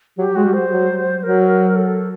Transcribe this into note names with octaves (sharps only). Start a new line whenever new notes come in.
F#3 G4
G#3 F#4
G3
C5
F#3
F#3 A#4
A4